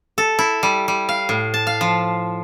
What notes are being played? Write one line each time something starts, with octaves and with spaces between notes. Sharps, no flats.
A4
E4
G3
G3
F5
A2
A5
F5
F3